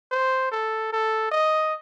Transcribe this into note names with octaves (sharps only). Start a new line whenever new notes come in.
C5
A4
A4
D#5